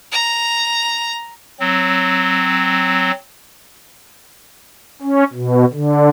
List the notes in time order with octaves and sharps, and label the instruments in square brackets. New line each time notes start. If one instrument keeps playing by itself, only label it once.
[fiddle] A#5
[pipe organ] F#3 C4
C#4
B2
D3